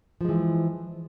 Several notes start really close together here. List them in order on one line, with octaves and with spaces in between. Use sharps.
F3 G#3 E3